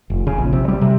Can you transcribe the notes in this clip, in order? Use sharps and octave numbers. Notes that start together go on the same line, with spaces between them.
F1
C#3
A#1
C3
G3
C3